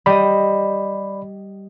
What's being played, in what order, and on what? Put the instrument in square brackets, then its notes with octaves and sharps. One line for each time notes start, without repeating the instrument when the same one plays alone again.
[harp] G3 D#5 [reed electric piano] D5 B5